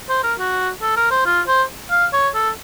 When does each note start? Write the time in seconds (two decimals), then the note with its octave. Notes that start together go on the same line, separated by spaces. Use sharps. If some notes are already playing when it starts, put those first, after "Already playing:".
0.09 C5
0.24 A#4
0.39 F#4
0.82 A4
0.97 A#4
1.11 C5
1.26 F4
1.48 C5
1.91 F5
2.13 C#5
2.35 A4